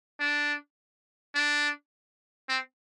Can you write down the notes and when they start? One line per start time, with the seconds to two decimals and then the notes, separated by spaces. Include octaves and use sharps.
0.20 D4
1.35 D4
2.49 C4